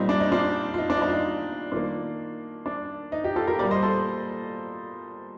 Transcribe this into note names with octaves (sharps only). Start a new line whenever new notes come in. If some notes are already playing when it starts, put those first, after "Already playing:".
Already playing: A#2 G3 C4 D#4
D4
D#4
D4 F4
F4
D#4
D4
D#4
D4
F4
D#4
D#3 A#3 D4 F4
D4
D#4
D#4 G4
F4 A4
G4 A#4
A#2 G3 A#3 A#4 D5
C5 D#5
A4 C5